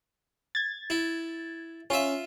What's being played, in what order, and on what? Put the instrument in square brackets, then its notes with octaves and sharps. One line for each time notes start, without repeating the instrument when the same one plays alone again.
[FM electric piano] G#6 A6
[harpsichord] E4
[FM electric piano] C#4 [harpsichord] F4 E5